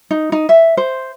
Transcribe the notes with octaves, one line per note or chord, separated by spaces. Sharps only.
D#4
D#4
E5
C5